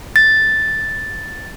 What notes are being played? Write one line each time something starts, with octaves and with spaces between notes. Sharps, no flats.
A6